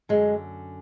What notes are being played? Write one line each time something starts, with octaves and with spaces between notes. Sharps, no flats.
F#2 D3 G#3